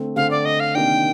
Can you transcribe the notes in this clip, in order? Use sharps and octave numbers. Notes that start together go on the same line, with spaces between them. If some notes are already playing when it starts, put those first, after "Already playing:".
Already playing: D3 A3 C4
D3 A3 C4 F5
D5
D#5
F5
C3 D#3 A#3 D4 G5